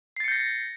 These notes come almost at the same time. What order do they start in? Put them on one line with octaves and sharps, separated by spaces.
C7 A6 C#7 G6 A#6